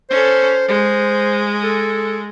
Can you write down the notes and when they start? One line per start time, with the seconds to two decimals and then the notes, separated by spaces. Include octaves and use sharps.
0.10 C#4 A4 C5
0.68 G#3 C5
1.63 A4